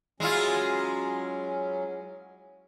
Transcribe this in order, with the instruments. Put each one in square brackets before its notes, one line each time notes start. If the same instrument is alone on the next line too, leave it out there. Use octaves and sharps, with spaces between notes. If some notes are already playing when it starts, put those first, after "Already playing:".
[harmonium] F#3 C#4 [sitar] G#3 E4 F4